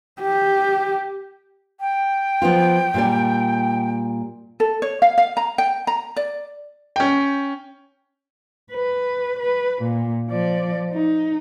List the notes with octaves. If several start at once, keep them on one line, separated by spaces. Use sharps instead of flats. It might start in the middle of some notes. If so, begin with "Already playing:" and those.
G4
G5
F3 B3 F4
A#2 G3 D5
A4
C#5
F5
F5
A#5
G5
A#5
D5
C#4 G5
B4
B4
A#2
F3 D5
D#4